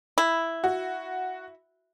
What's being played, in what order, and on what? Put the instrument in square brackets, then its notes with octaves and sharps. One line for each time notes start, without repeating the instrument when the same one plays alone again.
[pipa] E4
[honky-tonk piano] F#4